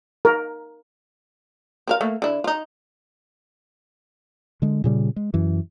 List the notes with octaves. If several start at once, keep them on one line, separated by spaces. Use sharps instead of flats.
A#4
C4 A#4 F5
A3 A#3
D3 E4
D#4 F4
D3 G#3
A#2 C#3 G3
G#3
F#2 E3